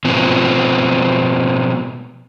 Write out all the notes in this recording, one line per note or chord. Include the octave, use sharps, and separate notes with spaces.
B2 F3 B3 C4